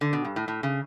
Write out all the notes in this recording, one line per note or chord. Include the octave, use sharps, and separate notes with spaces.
D3
B2
G2
A2
A2
C#3